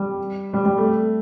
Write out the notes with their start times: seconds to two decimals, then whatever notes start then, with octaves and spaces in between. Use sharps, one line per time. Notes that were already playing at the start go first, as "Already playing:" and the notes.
Already playing: G3
0.53 G3
0.65 G3
0.78 A3